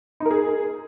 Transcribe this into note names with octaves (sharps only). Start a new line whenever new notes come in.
D#4
A#4
G#4